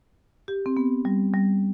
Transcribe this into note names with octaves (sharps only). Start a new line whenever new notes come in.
G4
C4
B3
G3
G3